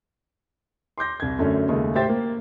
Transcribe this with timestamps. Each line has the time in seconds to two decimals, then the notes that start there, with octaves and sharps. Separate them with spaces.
0.98 C6 D6 G6 A#6
1.20 C2 G#6
1.39 F#2 D3 A3 C#4
1.68 D#2 C#3 G#3 A3
1.95 A2 G4 C5 E5 G5 A6
2.09 A#3